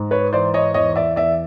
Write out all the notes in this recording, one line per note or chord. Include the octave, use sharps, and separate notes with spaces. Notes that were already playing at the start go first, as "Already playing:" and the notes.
Already playing: G#2
B4 C#5
E3 C5 D5
C#5 D#5
E2 C#5 D#5
D5 E5
E2 D5 E5